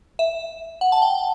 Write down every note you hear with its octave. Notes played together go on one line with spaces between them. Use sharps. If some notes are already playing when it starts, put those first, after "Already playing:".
E5
F#5
A5
G5